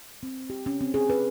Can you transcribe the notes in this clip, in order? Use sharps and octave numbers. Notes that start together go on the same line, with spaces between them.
C4
G4
C#4
C4
G#4
B4